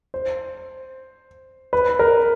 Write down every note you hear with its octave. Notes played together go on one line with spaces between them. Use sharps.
C5
B4
A#4